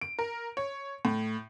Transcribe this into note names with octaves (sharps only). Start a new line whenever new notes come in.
D7
A#4
C#5
A2